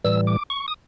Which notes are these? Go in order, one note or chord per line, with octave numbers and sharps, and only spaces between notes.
A2 E3 G3 E6
D6
C#6
D#6